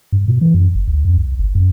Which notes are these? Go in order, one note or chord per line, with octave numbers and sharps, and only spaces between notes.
G2
B2
E3
F#2
G1
D2
F2
C2
G1
F#2